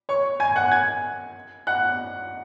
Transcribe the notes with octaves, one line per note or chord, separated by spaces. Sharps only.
C#5 C#6
G#5 G#6
F#5 F#6
G#5 G#6
F#5 F#6